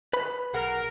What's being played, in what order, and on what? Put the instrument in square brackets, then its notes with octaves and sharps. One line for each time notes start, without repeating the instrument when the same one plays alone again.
[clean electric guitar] B4 B5
[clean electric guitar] B1 G#4 F#5 [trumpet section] A#4